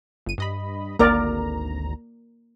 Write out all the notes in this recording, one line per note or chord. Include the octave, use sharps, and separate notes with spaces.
G1 D#7
G2 D#5 B5
G#1 D2 A#3 A#4 D5 A#5